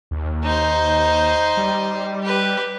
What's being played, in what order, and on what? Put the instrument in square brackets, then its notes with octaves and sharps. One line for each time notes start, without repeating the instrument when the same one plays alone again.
[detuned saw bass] D#2
[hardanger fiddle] D#4 C5
[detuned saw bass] G3
[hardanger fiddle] G4 B4